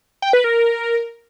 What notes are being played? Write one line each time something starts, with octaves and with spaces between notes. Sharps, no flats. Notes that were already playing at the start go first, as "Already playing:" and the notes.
G5
B4
A#4